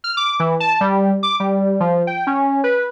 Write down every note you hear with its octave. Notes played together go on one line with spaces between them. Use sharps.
F6
D6
E3
A5
G3
D6
G3
F3
G5
C#4
B4